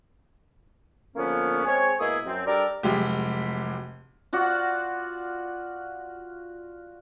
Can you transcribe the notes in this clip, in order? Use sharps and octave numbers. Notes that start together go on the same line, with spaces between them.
D3 F3 A#3 B3 C#4
G#3 C4 G#4 C#5
B2 G#3 A#3 E4 G#4
F#2 C4
G3 D4 G4 A4 A#4 D5
F1 F#3 G#3 G4
F4 F#4 D5 F#5